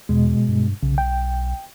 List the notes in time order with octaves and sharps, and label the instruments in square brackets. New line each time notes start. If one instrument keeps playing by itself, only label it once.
[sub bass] E2 [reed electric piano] B2 G#3
[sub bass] G2
[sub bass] B1 [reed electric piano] C#3
[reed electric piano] G5